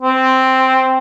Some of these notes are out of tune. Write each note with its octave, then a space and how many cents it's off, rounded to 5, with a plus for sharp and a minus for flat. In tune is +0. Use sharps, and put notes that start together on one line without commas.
C4 +0